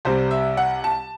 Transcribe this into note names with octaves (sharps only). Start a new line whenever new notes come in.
C2 C3 G3 C5
E5
F#5
A5